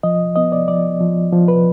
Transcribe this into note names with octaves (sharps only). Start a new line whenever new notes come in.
F3 D#5
B3 D#5
D5
F3 D5
F3
F3
B4